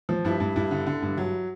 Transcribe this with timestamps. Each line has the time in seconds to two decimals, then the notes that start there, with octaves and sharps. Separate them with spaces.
0.09 F3
0.25 G2 E4
0.40 G2
0.56 G2 E4
0.71 D3
0.86 D3
1.02 G2
1.17 F#3